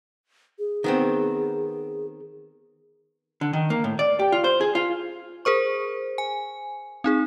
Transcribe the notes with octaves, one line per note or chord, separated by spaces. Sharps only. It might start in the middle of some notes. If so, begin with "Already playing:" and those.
G#4
D#3 B3 C4
D3
D#3
A#3
A2
D5
G4
F4
C5
G#4
F4
G#4 A#4 C5 C#6
G#5
C4 D#4 G#4